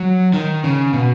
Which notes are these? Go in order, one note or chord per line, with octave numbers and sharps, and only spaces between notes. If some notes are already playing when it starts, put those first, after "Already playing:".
Already playing: F#3
D#3
C#3
B2